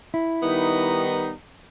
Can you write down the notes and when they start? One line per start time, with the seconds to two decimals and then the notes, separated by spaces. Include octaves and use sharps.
0.14 E4
0.42 D#3 G3 B3 D#4